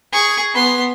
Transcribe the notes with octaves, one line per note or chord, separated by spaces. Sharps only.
G#4 C#6
B3 C6